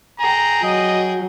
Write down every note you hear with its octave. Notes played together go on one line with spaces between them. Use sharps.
G#4 G5 A#5
F#3 D#5